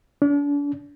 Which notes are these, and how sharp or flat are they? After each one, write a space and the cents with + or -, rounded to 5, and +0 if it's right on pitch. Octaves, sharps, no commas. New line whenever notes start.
D4 -40